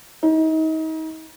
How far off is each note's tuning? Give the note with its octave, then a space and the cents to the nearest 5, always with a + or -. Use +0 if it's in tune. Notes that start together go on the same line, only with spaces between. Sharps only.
D#4 +35